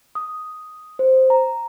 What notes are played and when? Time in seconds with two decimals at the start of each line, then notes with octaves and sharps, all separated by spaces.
0.15 D#6
0.99 C5
1.30 A#5